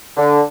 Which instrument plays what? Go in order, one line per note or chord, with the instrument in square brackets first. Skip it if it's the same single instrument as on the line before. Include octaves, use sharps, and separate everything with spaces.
[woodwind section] D3